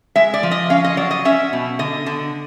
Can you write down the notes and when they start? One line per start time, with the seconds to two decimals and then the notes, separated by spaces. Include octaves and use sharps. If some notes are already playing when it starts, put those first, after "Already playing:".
0.16 G#3 E5
0.34 D5
0.43 F3
0.51 D#5
0.70 C#4 F5
0.84 D#5
0.97 F#3 D5
1.11 D#5
1.25 C#4 E5
1.53 B2
1.79 D3 D#5
2.06 D3